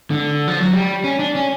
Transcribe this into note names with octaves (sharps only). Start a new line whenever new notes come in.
D3
F3
F#3
G3
C#4
D4
C#4